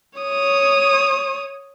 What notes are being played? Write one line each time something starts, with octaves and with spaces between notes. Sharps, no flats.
C#5 D#6